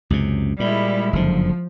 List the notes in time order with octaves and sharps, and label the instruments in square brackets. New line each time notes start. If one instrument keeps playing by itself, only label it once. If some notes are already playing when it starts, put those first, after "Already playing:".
[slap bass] C#2 F#2 C3
[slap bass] A#2 [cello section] G3 G#3 E4
[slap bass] F#1 F2 D3 [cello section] F3